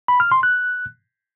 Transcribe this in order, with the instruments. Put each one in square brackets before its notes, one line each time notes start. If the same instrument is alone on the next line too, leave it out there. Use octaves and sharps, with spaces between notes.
[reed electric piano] B5
F6
C6
F#6